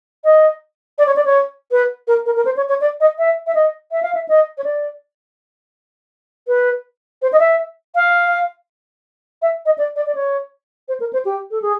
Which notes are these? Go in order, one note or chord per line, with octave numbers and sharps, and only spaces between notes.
D#5
D5
C#5
D5
C#5
B4
A#4
A#4
A#4
C5
C#5
C#5
D5
D#5
E5
E5
D#5
E5
F5
E5
D#5
C#5
D5
B4
C5
D#5
E5
F5
E5
D#5
D5
D5
D5
C#5
C5
A#4
C5
G4
A4
G#4